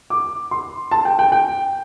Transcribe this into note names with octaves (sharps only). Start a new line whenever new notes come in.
D6
C6
A5
G5
G5
G5